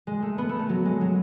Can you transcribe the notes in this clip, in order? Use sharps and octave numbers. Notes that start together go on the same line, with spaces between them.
G#3
A3
B3
A3
A3
F#3
G#3
F#3